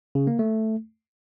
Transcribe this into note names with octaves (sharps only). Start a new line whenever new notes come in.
C#3
A#3
A3